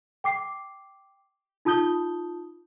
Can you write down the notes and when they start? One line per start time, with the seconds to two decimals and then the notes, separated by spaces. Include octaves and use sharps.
0.24 G5 D6 C7
1.65 D#4 F4 A5 D#6 G6 G7